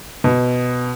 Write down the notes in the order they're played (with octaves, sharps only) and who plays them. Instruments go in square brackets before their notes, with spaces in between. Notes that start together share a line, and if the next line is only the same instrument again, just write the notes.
[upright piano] B2